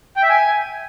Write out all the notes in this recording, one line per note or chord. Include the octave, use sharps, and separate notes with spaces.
G5
E5
G#5